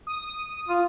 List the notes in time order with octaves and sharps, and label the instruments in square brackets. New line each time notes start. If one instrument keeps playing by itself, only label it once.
[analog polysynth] D#6
[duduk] F4